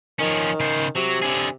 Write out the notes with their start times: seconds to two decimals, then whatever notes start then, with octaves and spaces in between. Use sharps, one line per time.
0.19 D#3 F3 C#4
0.60 C#3 C5
0.95 C3 F#3
1.22 D3 G#4